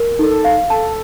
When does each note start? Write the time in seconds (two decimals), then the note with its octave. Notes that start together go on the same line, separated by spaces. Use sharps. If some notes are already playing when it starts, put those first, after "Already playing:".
Already playing: A#4
0.19 D#4 A4
0.45 F5
0.70 A4 A5